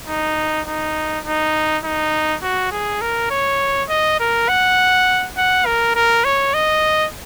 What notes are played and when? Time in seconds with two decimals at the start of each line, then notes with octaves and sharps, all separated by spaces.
0.08 D#4
0.67 D#4
1.25 D#4
1.84 D#4
2.43 F#4
2.72 G#4
3.01 A#4
3.31 C#5
3.89 D#5
4.20 A#4
4.48 F#5
5.37 F#5
5.66 A#4
5.95 A#4
6.25 C#5
6.54 D#5